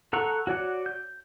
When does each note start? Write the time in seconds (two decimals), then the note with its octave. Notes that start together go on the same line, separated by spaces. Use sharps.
0.13 A4 F#5 A#5 C#6
0.47 F#4 C#5 D5 F#5
0.86 G6